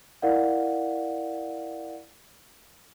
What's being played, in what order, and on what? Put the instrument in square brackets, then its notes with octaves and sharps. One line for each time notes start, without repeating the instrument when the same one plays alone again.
[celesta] E4 A#4 D5 F5 F#5